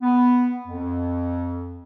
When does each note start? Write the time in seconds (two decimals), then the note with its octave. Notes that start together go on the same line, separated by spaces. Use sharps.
0.02 B3
0.68 F2